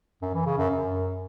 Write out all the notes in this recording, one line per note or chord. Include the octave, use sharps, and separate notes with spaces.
F#2
E3
C#3
F#2
F#2